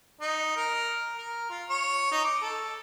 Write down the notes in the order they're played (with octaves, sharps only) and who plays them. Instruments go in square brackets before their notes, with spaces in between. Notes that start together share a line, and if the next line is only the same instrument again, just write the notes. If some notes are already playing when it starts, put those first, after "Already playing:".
[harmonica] D#4
A#4
A#4
F4
C#5
D#4
D6
A4